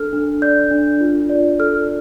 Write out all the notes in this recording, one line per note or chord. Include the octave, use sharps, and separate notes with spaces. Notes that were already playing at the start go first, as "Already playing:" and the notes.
Already playing: D4 A4 F6
D4
D5 G6
D4
F4
D5
A4 F6